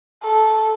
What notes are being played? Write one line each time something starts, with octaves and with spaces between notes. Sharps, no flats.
A4